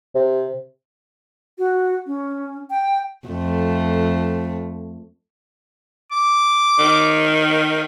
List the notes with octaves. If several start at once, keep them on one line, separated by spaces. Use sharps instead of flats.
C3
F#4
C#4
G5
F2 A3
D6
D#3